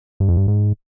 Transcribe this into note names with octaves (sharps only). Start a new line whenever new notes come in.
G2
F2
G2
G#2